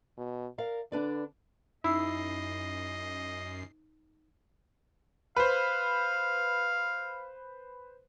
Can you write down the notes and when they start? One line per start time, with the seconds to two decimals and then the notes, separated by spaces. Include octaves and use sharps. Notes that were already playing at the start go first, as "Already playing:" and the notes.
0.18 B2
0.58 A#4 D5 F5
0.92 D3 D4 B4 D5
1.84 F#2 D#4 E4 D#5 E6 C7
5.37 B4 C5 F5